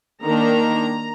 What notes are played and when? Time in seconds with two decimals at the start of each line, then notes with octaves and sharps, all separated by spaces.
0.23 D#3 A#3 D4 A#5